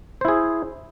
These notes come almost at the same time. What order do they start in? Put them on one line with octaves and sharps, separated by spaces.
C5 E4 G#4